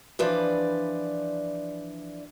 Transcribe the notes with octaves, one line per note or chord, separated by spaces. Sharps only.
E3 F3 D4 B4 D5